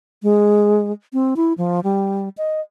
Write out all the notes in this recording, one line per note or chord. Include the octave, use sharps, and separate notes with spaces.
G#3
C4
E4
F3
G3
D#5